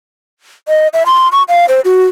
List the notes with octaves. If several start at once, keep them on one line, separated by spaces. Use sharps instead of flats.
D#5
E5
C6
C#6
F5
C5
F#4